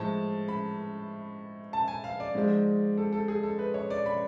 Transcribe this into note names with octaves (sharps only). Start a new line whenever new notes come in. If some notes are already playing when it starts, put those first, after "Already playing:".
Already playing: A2 F3 G#3 A5
B5
A5
G#5
F5
D5
G#2 F3 G#3
A4
A4
G#4
A4
B4
C#5
D5
B5